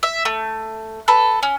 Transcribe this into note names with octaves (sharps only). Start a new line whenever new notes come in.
E5
A3
A4 B4
C#4